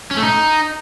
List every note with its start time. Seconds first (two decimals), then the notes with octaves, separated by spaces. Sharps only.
0.11 C#4
0.17 A3
0.23 D#4